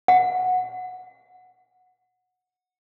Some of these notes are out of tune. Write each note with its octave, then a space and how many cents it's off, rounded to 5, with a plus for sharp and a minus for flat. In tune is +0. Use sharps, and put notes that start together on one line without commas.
F#5 -15